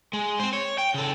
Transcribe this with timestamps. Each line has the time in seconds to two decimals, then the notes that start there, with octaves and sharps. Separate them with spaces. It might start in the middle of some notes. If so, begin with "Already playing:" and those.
0.13 G#3
0.40 C4 C5
0.53 C#5
0.78 G5
0.94 C#3 A4